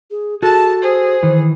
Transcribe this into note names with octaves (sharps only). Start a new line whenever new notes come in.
G#4
F#4 G#4 A4 A5
G#4 C5
D#3 E3